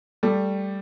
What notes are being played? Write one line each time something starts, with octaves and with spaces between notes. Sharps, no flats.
G3 A3